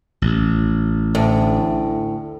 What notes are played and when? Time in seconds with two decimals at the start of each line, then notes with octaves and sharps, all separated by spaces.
0.22 A1
1.15 D2 A2